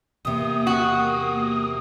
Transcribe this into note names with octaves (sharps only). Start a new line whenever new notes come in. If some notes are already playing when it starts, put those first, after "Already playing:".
E2 C3 A#3 D#6
F#4